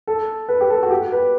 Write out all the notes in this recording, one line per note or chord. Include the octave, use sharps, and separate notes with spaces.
A4
B4
G4
A4
F#4
G4
B4